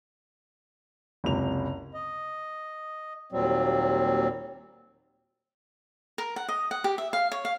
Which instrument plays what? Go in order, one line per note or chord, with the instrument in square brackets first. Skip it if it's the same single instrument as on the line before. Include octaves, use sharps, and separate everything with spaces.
[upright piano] F#1 C#2 C3 F7
[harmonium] D#5
D#2 A#2 F#3 G3 C4
[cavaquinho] A#4
F#5
D#5
F#5
G4
E5
F5
C#5
F5